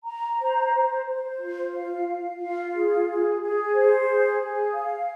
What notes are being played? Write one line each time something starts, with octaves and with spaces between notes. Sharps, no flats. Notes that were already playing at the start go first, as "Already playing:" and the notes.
A#5
C5
C5
C5
F4
F5
F5
F4
G#4
G#4
G#4
C5
G#4
G#4
F5